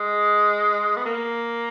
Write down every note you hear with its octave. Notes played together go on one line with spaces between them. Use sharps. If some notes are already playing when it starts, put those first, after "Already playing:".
Already playing: G#3
B3
A#3